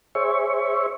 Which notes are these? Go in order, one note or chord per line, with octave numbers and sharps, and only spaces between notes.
G#4 C5 C#5 E5 C#6